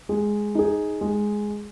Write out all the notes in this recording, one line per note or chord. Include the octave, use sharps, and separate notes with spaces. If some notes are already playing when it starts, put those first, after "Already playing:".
G#3
D#4 G#4
G#3